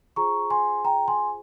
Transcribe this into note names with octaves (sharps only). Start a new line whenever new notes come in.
F4 G#4 C5 A#5 C#6
G#5 C6
G5 A#5
G#5 C6